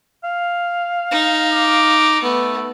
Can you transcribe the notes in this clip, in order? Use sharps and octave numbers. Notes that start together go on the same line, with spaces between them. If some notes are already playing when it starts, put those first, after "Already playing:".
F5
D#4
D6
A3 B3